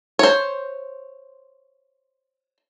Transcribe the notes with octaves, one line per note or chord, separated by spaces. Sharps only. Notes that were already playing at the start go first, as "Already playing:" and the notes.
C5 C#5